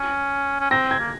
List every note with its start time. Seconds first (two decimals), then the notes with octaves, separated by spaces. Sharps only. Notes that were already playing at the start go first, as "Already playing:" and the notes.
Already playing: C#4
0.60 C#4
0.71 C4 A#6
0.91 G#6
1.00 A#3